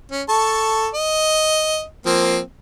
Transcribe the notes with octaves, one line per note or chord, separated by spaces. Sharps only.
C#4
A4 A5 C#6
D#5
F3 A#3 C4